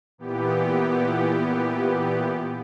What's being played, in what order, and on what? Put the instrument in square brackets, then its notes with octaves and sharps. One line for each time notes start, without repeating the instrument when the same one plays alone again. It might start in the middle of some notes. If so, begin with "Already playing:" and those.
[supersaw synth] A#2 E3 B3 G4